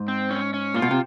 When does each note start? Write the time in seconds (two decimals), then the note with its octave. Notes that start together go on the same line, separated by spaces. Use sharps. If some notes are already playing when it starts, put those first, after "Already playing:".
Already playing: G#2
0.08 C4
0.31 C#4
0.54 C#4
0.74 A#2 F4
0.82 B2
0.91 C3